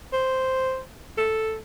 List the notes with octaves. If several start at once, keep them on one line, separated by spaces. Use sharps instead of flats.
C5
A4